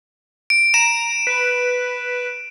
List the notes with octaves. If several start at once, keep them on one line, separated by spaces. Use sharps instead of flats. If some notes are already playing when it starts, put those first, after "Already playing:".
D7
A#5 E7
B4